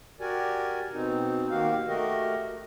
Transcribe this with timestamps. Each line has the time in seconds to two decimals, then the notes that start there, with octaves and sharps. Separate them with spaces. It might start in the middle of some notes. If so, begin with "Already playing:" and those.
0.21 F#4 G4 A#4 D5 G#5
0.94 B2 C4 D#4
1.51 D#3 A#3 F#4 G4 F5
1.88 A3 F#4 G4 A#4 D#5